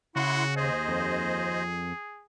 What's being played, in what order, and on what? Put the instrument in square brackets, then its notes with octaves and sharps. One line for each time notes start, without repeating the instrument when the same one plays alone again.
[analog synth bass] C#3 [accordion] E4 F#5 C6 [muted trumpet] F#4
[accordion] D#2 C5 D#5 [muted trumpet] G#4
[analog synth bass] F2